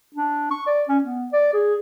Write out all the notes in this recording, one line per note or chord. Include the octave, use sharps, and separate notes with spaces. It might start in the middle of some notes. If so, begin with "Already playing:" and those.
D4
C#6
D5
C#4
B3
D5
G#4